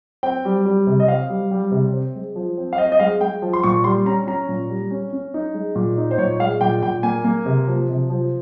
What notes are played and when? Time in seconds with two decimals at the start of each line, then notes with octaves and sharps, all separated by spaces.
0.23 C4 G5
0.45 G3
0.65 G3
0.87 C3
1.00 D#5
1.08 C4 F5
1.29 G3
1.51 G3
1.71 C3
1.93 C4
2.15 G#3
2.36 F3
2.58 C4
2.73 F5
2.78 C4 D#5
2.92 D#5
3.00 G#3 F5
3.21 G#3 G5
3.42 F3
3.53 C6
3.63 A#2 C#6
3.84 G3 C6
4.06 C#4 A#5
4.27 C#4 A#5
4.49 A#2
4.70 G3
4.91 C#4
5.13 C#4
5.34 D#4
5.54 G#3
5.76 A#2
5.98 D#4
6.11 C5
6.18 A#2 C#5
6.40 G#3 F5
6.61 A#2 G5
6.82 A#2 G5
7.03 A#3 G#5
7.25 A#3
7.46 C3
7.68 F3
7.89 C3
8.10 F3